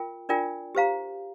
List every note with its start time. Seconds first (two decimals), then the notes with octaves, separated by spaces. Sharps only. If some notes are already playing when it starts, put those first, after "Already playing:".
Already playing: F4 A#4 G5
0.29 D4 F4 A#4 D5 G5
0.75 G4 C5 F5 A#5